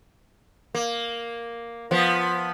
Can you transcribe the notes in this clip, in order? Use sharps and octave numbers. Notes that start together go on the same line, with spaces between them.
A#3
F3 B3